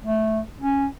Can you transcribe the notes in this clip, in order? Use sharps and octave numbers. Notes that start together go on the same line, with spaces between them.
A3
C#4